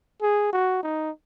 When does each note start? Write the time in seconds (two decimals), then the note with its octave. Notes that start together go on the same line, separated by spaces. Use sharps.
0.22 G#4
0.53 F#4
0.83 D#4